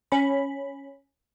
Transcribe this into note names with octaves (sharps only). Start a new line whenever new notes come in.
C#4 B5